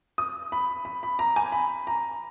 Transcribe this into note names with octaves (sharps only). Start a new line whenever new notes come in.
D#6
B5
B5
B5
A#5
G#5
B5
A#5